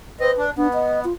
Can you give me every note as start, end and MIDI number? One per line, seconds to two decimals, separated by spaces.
0.20 0.31 60
0.20 0.45 71
0.20 0.31 75
0.38 0.50 62
0.57 1.05 59
0.57 0.68 62
0.74 1.00 75
1.04 1.13 65